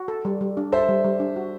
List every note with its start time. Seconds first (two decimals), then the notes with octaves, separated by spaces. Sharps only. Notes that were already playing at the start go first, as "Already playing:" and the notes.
Already playing: F#4
0.08 A4
0.25 G3
0.41 G3
0.57 D4
0.72 A4 C5 E5
0.89 G3
1.04 G3
1.20 D4
1.36 F#4